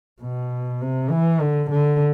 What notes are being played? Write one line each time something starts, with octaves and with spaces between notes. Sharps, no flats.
B2
C3
E3
D3
D3